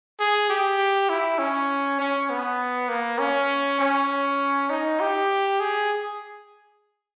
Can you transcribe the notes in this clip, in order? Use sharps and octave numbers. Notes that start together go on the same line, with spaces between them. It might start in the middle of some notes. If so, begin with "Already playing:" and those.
G#4
G4
E4
C#4
C#4
B3
A#3
C#4
C#4
D#4
G4
G#4